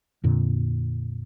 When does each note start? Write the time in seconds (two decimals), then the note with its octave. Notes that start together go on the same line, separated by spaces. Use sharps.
0.24 F2 A#2 D3